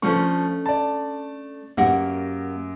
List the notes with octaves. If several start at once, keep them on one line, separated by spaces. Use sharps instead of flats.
F3 A3 C#4 D4 C#6
D5 A5
F#2 A#3 G4 F#5